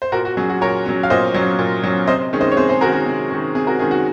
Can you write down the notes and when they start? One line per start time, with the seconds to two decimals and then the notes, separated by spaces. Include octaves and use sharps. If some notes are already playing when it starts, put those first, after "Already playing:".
0.02 C5
0.12 A#2 F#4 A#4
0.25 F#4
0.37 F#3 C#4 G#4
0.50 F#4
0.61 A#2 A#4 C#5
0.86 F#3 C#4
1.03 F5
1.10 A#2 C5 D#5
1.34 F#3 C#4
1.59 A#2
1.84 F#3 C#4
2.07 C3 C5 D#5
2.33 D#3 G#3 C#4
2.41 C5 D#5
2.51 C#5
2.57 C3 G#4 C5
2.69 G#4 C5
2.81 D#3 G#3 C#4 F#4 A#4
2.93 F#4
3.06 C3
3.31 D#3 G#3 C#4
3.55 C3 G#4
3.67 F#4 A#4
3.79 D#3 G#3 C#4 G#4
3.91 F#4